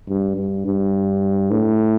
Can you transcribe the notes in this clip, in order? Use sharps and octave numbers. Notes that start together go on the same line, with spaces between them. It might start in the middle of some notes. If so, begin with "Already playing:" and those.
G2
G2
G2
A2